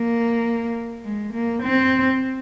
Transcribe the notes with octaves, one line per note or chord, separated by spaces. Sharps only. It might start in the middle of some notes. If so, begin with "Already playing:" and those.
Already playing: A#3
G#3
A#3
C4